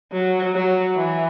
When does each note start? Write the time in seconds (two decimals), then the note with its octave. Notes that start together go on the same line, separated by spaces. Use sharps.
0.13 F#3
0.54 F#3
0.97 E3